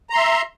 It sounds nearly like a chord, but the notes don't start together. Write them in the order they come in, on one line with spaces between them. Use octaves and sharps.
A#5 C6 E5